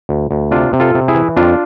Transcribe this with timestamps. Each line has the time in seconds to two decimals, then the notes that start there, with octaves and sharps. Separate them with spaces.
0.09 D2
0.31 D2
0.51 C3 D4 F4
0.73 C3
0.80 F4 A4
0.95 C3
1.08 E4 G#4
1.15 E3
1.36 F2 D4 F4